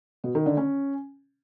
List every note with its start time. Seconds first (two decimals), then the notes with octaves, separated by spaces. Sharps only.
0.24 B2
0.35 D#3
0.46 D3
0.57 C#4